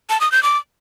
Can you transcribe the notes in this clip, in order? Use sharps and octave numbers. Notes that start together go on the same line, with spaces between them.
A5
D#6
G6
D6